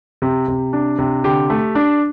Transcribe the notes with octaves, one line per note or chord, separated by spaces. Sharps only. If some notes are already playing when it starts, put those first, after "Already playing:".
C3
C3
D4
C3
D3 G4
A3
D4